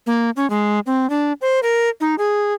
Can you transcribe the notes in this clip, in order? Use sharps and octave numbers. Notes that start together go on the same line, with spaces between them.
A#3
C#4
G#3
C4
D4
C5
A#4
D#4
G#4